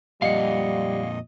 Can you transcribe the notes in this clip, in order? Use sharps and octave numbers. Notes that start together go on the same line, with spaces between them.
F2 A#2 G3 D#5 F5 F#5